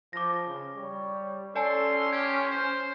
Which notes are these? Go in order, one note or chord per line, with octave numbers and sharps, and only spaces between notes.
F3 D6 A#6
C#3
G3 C#5
C#4 A4 D5 G#5 A5 C6
G4 C6 F6 G#6
C5